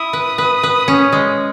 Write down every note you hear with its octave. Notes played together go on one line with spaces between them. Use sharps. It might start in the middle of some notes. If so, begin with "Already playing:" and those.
Already playing: E4 D#6
B4
B4
B4
C#4
G#3